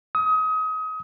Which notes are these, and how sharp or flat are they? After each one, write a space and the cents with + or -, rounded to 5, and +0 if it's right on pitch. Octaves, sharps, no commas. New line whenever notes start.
D#6 +30